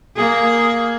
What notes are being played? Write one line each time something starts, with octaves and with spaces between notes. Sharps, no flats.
A#3 G#4